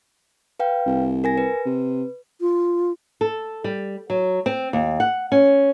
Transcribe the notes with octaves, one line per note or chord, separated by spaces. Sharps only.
B4 F5 G5
C2
A#4 G#5 A#6
B4
C3
F4
A4
G3
F#3
C4
D#2
F#5
C#4